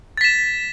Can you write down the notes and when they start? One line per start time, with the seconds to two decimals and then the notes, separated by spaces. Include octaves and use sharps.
0.17 A6
0.21 B6
0.24 E7